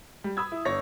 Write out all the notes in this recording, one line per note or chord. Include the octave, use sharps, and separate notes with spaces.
G3
B5 D#6 E6 G#6
E4
G1 C#5 A#6